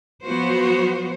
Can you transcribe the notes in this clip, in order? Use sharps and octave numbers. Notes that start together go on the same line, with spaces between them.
F3 F#3 B3 F#4 C5